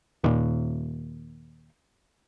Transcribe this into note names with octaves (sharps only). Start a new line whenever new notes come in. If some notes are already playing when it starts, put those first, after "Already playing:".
D#2 A#2